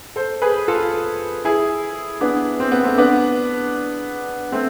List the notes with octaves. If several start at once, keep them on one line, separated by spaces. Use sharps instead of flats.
A4 C5
G#4 B4
F4 A4
E4 G#4
B3 D4
C4
B3
A3 C4
B3 D4
A3 C4